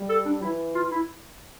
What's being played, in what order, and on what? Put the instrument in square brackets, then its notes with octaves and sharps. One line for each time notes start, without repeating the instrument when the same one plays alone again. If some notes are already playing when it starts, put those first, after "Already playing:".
Already playing: [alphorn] G3
[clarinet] A4
D4
[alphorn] E3 [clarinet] E4
[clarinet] F4
E4